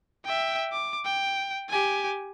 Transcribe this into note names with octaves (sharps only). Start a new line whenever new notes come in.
E5 G5
D6
G5
G4 G#5